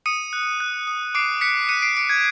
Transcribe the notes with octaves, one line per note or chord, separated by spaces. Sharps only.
D#6 C#7 D#7
F#6
F#6
D#6
D6 C7 D7
F#6 B6 C#7
F#6 C#7 D#7
C7 D7
D6 C7 D7
G#6